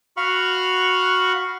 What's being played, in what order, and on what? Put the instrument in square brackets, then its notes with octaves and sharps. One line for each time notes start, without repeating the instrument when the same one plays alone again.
[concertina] F#4 F5 F#5 B5 C#6 F6